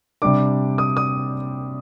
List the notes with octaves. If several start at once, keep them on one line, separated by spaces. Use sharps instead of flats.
C3 G3 D4 D6
D#6
D#6